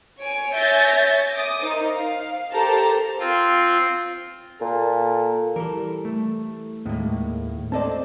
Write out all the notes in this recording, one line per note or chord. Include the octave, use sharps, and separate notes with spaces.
C#5 G#5 D7
C#5 E5 G#5 G6 A6 A#6
D6 D#6
D#4 A#4 C5
F5
G4 A4 A#4 C5 A5 A#5
C4 F4
A#2 A4
E3 G3 A4 A#4
A3
D#2 A2 G#3 A#3
C4 A4 C5 D5 D#5 A5